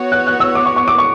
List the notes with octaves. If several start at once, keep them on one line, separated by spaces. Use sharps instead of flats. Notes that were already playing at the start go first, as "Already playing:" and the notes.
Already playing: B3 F#4 C#5
F#6
F#6
E6
D6
C#6
C#6
D6
C#6